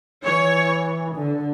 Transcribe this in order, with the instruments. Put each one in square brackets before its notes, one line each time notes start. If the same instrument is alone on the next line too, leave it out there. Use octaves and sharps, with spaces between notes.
[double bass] E3 [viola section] C#5
[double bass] D3